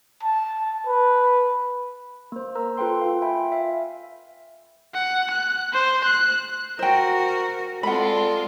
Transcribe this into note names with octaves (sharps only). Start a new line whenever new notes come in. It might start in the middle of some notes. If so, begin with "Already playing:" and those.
A5
B4
A#3 C5
A#4 C5 A#5 E6
F4 A4 B4 G5 C6
F4 F5
E5 G5 G#5 B5
E5 F5
F#5
F#6
C5
F#6
F#4 A#4 C5 G5
G#3 C4 F4 A4 D5 F#5 B5